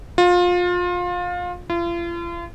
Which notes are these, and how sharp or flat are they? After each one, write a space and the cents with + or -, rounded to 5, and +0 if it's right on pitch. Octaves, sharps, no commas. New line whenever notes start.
F4 +25
F4 -40